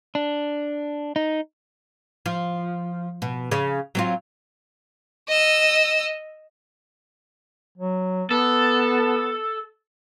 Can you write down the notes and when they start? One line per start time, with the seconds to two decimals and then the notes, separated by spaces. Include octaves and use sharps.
0.15 D4
1.16 D#4
2.26 F3
3.22 B2
3.51 C#3 C#4
3.95 F#3 C4 F4
5.28 D#5 E6
7.78 F#3
8.31 B3 A4